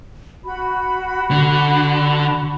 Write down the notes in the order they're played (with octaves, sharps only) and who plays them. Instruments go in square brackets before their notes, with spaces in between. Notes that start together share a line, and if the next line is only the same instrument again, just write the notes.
[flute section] F#4 B5
[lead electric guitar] D3